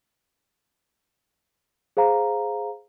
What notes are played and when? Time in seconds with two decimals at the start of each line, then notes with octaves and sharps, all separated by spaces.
1.97 G#4 C5 F5 A#5